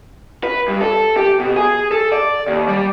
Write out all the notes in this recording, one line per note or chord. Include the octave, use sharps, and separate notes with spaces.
B4
G2
A4
G4
B2
G#4
A4
D5
D#2
G3